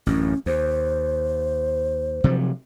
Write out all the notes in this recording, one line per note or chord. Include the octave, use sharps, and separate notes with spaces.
A1 F#2 C#4
D#2 C5
C3 F3 F#3